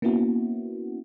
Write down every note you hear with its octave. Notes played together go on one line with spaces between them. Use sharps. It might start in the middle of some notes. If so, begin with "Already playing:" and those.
A#3 B3 C#4 E4 F#4